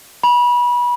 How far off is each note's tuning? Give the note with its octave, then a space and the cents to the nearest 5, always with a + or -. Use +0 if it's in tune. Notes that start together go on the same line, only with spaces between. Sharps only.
B5 -25